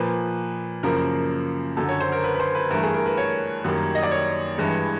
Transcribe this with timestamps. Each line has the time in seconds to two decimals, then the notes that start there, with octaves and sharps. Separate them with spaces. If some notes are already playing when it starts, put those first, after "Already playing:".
Already playing: A#2 F3 A#3 B4
0.83 F#2 C#3 F3 A#3 A#4
1.77 F#2 D3 F#3 A4
1.89 C#5
2.00 C5
2.12 A#4
2.24 B4
2.35 B4
2.40 C5
2.55 B4
2.71 G2 E3 A3 A#4
2.83 G#4
2.94 A#4
3.06 B4
3.17 C#5
3.65 F#2 D#3 G3 A#3
3.95 D#5
4.03 D5
4.11 C#5
4.58 G2 E3 G#3